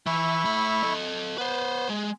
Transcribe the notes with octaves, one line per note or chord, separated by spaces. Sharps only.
E3 E4 E5 C#6
A3 B5
A4 D#5
B3 B4 C5
G#3